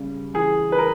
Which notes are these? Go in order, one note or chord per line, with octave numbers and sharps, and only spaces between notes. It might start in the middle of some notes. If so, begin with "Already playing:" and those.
Already playing: C#3 G3
E3 G#4
B4
A#4